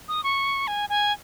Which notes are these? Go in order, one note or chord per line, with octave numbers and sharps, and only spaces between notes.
D#6
C#6
G#5
G#5